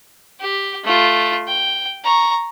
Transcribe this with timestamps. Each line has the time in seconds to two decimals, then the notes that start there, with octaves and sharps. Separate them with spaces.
0.40 G4
0.84 A3 F4
1.48 G5
2.04 A#5 C#6